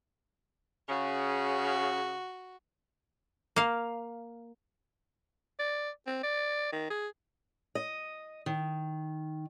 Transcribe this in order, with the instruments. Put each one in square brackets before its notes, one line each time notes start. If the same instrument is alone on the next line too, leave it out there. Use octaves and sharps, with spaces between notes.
[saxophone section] C#3 [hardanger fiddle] F#4
[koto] A#3 F5
[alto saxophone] D5
C4
D5
D#3
G#4
[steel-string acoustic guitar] D#5
D#3